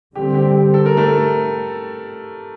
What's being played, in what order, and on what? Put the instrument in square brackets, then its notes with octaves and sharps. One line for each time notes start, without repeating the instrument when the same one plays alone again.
[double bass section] D3 G3 C4 [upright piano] G4
[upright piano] G4
A4
A#4
A3 A4